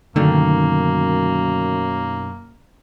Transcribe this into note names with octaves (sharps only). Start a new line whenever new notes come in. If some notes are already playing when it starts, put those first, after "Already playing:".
B1 F#2 D3 D#3 A3 A#3